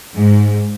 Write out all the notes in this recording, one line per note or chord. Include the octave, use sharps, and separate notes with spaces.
G#2